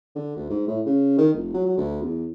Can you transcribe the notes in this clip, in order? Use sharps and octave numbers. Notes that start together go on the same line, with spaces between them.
D3
D2
G#2
A2
C#3
D#3
F1
F#3
F#3
D2
E2